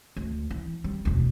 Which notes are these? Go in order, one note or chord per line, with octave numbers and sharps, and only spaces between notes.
D2
E3
G3
E1 D2